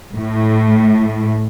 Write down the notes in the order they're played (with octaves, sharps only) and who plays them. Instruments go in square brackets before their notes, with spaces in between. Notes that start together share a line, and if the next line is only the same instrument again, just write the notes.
[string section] A2